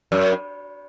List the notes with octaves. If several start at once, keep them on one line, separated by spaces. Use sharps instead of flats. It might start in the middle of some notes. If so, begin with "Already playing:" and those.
F#2